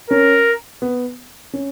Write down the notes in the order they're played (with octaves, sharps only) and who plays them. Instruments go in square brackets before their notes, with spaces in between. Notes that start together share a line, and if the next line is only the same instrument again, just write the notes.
[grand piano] C#4 [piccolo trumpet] A#4
[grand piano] B3
C#4